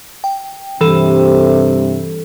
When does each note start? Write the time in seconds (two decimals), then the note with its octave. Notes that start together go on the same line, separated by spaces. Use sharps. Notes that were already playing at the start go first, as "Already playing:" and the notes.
0.24 G5
0.81 G2 C3 E3 A4